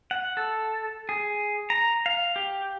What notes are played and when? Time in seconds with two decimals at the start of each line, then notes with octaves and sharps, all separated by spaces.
0.11 F#5
0.37 A4
1.09 G#4
1.70 A#5
2.06 F5
2.36 G4